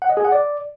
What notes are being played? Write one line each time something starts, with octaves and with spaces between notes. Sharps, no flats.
F#5
D#5
G#4
F#5
D5